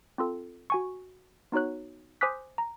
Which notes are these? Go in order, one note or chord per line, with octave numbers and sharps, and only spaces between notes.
C4 F4 A4
F#4 G#5 C#6
B3 D#4 F#4 C#5 F#6
C5 G#5 D6 D#6 F#6 B6
A#5